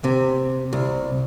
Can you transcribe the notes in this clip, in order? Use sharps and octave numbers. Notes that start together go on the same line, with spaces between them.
C3
C2